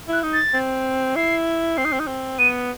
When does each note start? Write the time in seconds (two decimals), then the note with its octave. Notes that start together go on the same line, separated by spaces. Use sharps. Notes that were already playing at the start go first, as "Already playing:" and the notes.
0.08 E4 F#6
0.23 D#4
0.33 A6
0.54 C4
1.16 E4 C7
1.77 C4 C7
1.85 D#4
1.92 C4
1.99 D#4
2.07 C4
2.39 B3 D#7